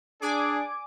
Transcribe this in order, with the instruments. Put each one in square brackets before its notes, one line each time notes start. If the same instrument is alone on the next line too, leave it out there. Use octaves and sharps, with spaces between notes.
[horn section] D4 G#4 [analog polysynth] D5 G#5 D6